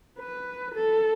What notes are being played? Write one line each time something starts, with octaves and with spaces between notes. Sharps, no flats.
B4
A4